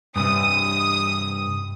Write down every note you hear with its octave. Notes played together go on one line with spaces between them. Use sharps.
G2 C3 D#6